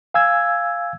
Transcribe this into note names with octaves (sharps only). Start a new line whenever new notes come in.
F5 G#5 E6 G#6